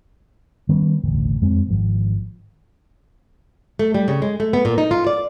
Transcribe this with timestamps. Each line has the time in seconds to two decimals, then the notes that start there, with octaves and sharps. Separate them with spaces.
0.69 D#3 G3 B3 C#4
1.04 E1 A1 D2
1.42 F2 G#3 C4
1.69 G#1 F3
3.79 A3
3.94 G3
4.08 C#3
4.22 G#3
4.40 A3
4.53 B3
4.65 A#2
4.78 D#4
4.91 F4
5.07 D5